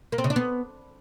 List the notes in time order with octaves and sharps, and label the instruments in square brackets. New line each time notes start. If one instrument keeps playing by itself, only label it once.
[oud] A#3
C4
C#3
D4
B3